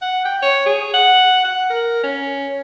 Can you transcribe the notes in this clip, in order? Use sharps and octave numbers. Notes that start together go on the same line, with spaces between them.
F#5
G5
C#5
G#4
F#5
F#5
A#4
C#4